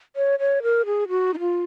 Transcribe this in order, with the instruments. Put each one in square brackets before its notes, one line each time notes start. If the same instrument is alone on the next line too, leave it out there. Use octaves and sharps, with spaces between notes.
[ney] C#5
C#5
A#4
G#4
F#4
D#4
F4